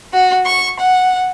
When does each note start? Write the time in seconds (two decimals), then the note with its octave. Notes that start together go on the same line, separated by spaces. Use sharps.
0.13 F#4
0.46 C#6
0.80 F#5